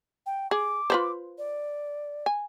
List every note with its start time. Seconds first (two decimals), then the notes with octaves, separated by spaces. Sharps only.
0.26 G5
0.51 G#4 D6
0.90 F4 B4 C5
1.38 D5
2.26 G#5